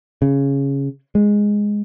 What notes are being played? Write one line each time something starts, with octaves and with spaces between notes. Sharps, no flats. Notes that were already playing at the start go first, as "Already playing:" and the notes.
C#3
G#3